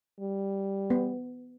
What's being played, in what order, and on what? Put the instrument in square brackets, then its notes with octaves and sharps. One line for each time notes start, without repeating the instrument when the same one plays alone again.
[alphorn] G3
[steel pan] B3